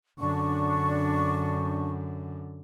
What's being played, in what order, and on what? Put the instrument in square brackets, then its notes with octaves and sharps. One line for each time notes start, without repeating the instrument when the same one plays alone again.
[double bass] F#2 D3 [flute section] D4 C#6